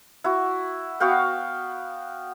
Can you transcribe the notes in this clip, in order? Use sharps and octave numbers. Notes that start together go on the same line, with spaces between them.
E4 F#4
B3 F#4 F5 G5